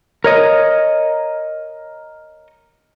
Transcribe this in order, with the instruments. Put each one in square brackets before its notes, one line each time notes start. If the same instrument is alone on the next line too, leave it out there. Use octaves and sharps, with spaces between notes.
[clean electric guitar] A#4 C#5 D#5